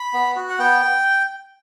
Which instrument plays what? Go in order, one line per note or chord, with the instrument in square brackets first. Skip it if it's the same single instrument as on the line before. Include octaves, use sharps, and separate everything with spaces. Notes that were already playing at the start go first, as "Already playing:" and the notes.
Already playing: [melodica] B5
B3
F#4
F#5
B3 G5